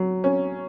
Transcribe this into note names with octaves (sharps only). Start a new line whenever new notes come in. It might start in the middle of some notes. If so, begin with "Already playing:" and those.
Already playing: F#3
C#4